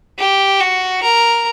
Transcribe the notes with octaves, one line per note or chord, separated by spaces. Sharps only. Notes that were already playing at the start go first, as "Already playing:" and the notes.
G4
F#4
A#4